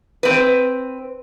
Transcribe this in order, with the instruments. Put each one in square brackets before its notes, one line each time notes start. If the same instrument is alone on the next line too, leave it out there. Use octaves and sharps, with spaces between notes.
[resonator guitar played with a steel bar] C4 B4